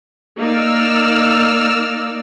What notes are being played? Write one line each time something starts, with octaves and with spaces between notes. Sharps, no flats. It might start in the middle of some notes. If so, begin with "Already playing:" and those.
A#3 D#4 D5 E6 F6